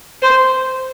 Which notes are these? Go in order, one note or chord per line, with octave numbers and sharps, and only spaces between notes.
C5